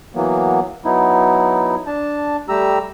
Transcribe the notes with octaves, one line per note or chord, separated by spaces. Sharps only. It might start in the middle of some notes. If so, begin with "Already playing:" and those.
E3 F#3 A#3 B3
F#3 B3 D#4 E4
D4 A5
G3 A3 G4 A#5 E6